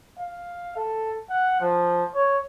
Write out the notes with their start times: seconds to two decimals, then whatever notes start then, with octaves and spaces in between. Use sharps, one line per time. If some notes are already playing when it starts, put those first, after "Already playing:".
0.19 F5
0.76 A4
1.30 F#5
1.61 F3
2.15 C#5